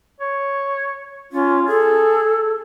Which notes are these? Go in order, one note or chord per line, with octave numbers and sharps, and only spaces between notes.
C#5
C#4 F4
G#4 A4